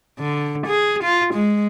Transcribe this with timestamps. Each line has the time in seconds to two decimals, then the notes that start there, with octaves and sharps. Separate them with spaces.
0.19 D3
0.67 G#4
1.03 F4
1.34 G#3